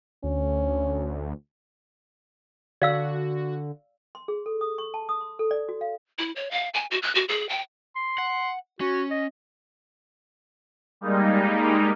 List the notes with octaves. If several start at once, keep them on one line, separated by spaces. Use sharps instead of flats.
D2 C#4
D3 F#4 D5 F5 E6
C6
G#4
A4
D#6
C#6
A5
D#6
C6
A4
D5
F#4
F5
E4
C#5
F5
G#5
F#4
F#6
F#4
G#4
G5
C6
F#5
C#4 F#4
D#5
G3 G#3 A#3 D#4